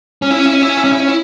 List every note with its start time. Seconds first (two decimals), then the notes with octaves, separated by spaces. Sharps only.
0.22 C#4
0.31 E4
0.38 C#4
0.46 E4
0.53 C#4
0.62 E4
0.69 C#4
0.77 E4
0.84 C#4
0.92 E4
1.00 C#4
1.08 E4